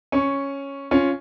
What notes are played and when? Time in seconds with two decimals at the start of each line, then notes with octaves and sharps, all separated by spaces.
0.12 C#4 C#6
0.91 C#4 F4